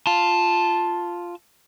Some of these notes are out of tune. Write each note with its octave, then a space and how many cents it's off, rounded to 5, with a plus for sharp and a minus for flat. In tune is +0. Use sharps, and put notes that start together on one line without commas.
F4 +0 A5 +0